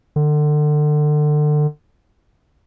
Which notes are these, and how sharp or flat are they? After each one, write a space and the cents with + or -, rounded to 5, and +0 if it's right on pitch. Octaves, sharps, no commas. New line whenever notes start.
D3 +30